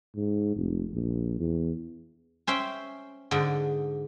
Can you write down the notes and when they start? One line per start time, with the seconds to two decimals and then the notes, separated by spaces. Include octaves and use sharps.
0.16 G#2
0.56 F1
0.93 A#1
1.39 E2
2.47 C#4 C5 E5 G5
3.31 G#2 D3